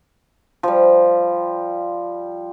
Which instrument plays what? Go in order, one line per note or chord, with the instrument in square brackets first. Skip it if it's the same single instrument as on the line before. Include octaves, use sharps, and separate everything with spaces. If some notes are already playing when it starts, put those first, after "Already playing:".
[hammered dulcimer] F3 G3